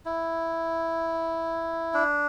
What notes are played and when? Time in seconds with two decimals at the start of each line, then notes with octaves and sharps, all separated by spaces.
0.05 E4
1.94 D4